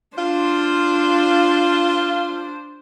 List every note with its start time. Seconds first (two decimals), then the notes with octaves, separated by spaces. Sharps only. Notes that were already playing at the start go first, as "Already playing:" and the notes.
0.17 D4 F4 C5